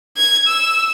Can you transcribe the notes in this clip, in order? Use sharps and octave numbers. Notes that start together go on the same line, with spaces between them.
G#6
E6